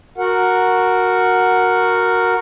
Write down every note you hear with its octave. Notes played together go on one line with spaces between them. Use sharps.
F#4 A#4 F#5